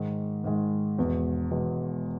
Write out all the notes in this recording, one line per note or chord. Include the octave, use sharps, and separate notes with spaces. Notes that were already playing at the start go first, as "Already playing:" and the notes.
Already playing: G#2 D#3 G#3
G#2 D#3 G#3
E1 E2 B2 G#3
E1 E2 B2 G#3